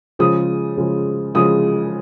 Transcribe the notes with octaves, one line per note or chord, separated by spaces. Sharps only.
C#3 F3 G#3 D#6
C#3 F3 G#3
C#3 F3 G#3 D#6